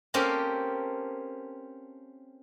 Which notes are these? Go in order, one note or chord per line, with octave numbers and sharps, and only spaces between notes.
A#3 C4 C#4 G4 A4 A#4